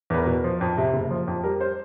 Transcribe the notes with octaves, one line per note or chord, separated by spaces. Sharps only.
E2 B4
A#4
B2
F3
F2
C3
F#1
F3
F2
G3 A#4
C5